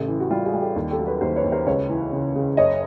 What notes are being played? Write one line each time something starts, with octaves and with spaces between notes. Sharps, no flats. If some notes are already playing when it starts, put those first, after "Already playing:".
Already playing: A1 C#3 G4 A4
E3
F#4
G3 F4 G4
F#4 G#4
G3
G4 A4
D#2
G4 A4
F#3
A4 B4
D#2 A#4 C5
B4 C#5
D#2
A#4 C5
C#2 B4 C#5
E3
C#3
C#3
F#1 C#5 D#5